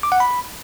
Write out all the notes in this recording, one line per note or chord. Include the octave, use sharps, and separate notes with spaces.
D6
F#5
B5